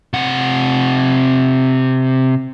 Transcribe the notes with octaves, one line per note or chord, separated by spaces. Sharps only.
C3 F#5